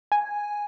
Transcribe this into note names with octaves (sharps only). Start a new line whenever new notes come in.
G#5